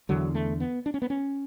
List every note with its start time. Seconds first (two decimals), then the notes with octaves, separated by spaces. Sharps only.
0.09 E2 D3 F#3
0.35 A3
0.60 B3
0.86 D4
0.94 C#4
1.02 B3
1.10 C#4